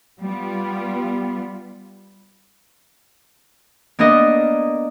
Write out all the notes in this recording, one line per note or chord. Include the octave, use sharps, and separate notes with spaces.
G3 B3 F4
A#3 B3 D4 A#4 D#5